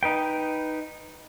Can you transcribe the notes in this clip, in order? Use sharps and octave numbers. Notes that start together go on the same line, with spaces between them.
D#4 B4 G5